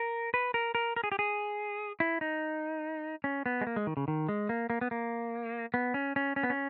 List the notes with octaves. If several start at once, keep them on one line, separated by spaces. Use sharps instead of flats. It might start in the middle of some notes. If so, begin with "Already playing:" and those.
Already playing: A#4
B4
A#4
A#4
A#4
G#4
G4
G#4
E4
D#4
C#4
B3
G#3
A#3
G#3
D#3
C#3
D#3
G#3
A#3
A#3
B3
A#3
B3
C#4
C#4
C#4
B3
C#4